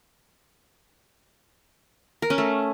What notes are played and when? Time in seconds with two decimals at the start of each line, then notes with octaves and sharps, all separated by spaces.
2.22 A#4
2.30 C#4
2.38 A3